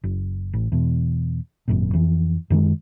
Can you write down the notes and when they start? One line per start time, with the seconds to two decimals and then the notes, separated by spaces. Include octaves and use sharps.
0.04 F#1
0.53 A1
0.72 E2 B2
1.68 G#1 F#2 A#2
1.93 F2 E3
2.50 F#2 D#3 F3 G#3